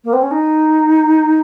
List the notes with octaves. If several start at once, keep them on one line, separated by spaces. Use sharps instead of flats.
A#3
C4
C#4
D#4